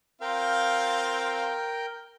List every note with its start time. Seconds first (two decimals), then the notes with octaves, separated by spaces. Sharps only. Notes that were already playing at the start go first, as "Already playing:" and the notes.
0.21 C4 F4 A#4 F5 G5